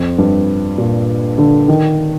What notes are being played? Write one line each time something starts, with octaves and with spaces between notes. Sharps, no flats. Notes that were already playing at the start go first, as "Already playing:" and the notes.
Already playing: F2
G2
A#2
D3
D#3